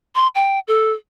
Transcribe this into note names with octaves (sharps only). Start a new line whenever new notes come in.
C6
G5
A4